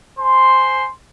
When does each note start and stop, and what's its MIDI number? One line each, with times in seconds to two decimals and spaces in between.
0.19 0.85 72
0.19 0.85 80
0.19 0.85 84